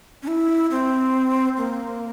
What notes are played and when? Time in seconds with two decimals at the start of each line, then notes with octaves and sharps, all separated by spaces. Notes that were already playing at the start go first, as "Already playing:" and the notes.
0.22 C#4
0.27 E4
0.71 C4
1.57 A#3